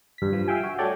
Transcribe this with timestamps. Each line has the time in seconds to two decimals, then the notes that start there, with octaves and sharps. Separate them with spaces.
0.18 G2 B6
0.33 F3
0.48 E5 F5 G5 G#5
0.63 F#4
0.78 A3 F#4 A4 C#5 D5 G5